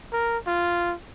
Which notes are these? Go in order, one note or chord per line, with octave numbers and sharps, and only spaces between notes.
A#4
F4